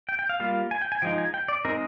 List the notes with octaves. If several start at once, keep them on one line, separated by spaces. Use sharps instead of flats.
G5
G5
F5
G3 A#3 F4 F5
G#5
G5
G#5
F3 G#3 D#4 G5
G#5
G5
D5
G#3 C4 D#4 A#4